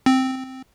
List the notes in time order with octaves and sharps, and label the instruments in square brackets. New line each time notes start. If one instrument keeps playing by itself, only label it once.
[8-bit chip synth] C4